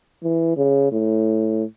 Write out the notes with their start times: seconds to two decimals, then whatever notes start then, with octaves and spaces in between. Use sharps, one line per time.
0.23 E3
0.57 C#3
0.92 A2